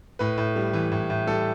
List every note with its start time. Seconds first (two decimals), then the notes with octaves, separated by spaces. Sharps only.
0.19 A2 B4
0.38 A2
0.56 G3
0.73 E3
0.92 A2
1.10 A2
1.27 G3 A4